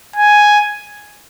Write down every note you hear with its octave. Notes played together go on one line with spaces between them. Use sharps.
G#5